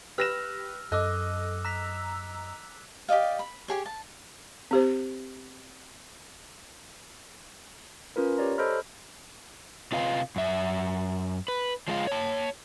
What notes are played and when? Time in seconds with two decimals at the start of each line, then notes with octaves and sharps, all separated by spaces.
0.18 G4 B4 E6 F6 A#6 E7 F7
0.92 F#2 A4 D#5 D6 E6 F#6
1.64 A#5 E6 F#6 B6 F7
3.08 G4 D5 D#5 F5
3.39 B5
3.68 G4 G#4 C#5
3.86 A5
4.71 C4 G4 C5
8.16 C#4 F4 A#4 B4
8.38 G4 C#5 D5 A#5
8.58 A4 C5 D#5 B5 F6
9.92 C3 F4 B4 D#5 F5
10.36 F#2 E5
11.48 B4
11.88 F3 G#3 F4
12.07 C#5 A5